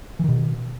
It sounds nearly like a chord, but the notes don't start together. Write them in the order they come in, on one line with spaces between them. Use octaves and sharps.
E3 D#3 B2